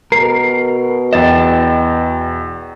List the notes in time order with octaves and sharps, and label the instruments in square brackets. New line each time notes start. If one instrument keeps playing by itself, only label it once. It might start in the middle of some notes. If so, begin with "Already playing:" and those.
[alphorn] B2 [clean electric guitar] A#4 [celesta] C7
[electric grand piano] E2 A6 E7 [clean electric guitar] D#5 G5